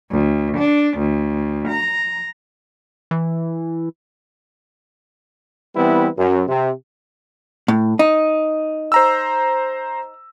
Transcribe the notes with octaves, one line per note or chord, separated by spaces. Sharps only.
D2
D4
D2
A#5
E3
E3 G3 B3 C4 E4 B4
F#2
C3
A2
D#4
C5 A#5 E6